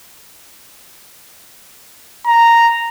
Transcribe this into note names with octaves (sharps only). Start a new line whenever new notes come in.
A#5